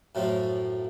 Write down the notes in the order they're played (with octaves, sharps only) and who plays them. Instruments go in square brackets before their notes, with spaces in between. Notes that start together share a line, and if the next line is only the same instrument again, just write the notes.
[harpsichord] F#2 A2 F3